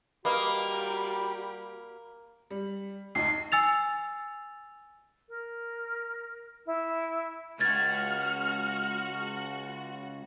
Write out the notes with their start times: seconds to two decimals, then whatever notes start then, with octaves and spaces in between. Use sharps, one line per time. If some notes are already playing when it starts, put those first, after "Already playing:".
0.25 G3 A#3 F#4 B4 D#5 F5
2.51 G3
3.15 D2 D#4 C7
3.52 G#5 E6 A6 F7
5.29 A#4
6.66 E4
7.60 C#2 F#4 F6 G#6 A6